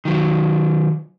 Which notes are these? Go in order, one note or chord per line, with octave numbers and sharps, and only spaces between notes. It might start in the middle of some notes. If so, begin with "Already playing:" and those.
D#3 F#3